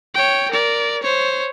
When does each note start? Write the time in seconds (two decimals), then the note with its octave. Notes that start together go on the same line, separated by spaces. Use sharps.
0.14 C#5 G5
0.51 A#4 D5
1.02 C5 C#5